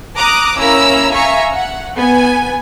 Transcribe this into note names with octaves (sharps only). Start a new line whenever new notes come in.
A#5 D6 D#6 F#6
A#3 C#4 E4 A#5 E6
E5 F5 G#5 A#5 C#6
F#5
B3 G#5